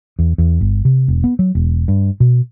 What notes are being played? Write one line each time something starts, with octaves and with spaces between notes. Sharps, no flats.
E2
E2
G1
C3
E1
B3
F#3
E1
G2
B2